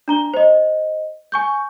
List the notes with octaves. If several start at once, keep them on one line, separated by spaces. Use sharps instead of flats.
D4 A#5 G7
C5 D#5
G#5 C#6 G6